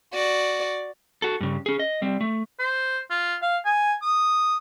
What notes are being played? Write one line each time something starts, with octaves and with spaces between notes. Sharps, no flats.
F#4 D5
F#4 A4
G2 C#3
C#4 G#4
D#5
G3 C4
A3
C5
F4
F5
G#5
D#6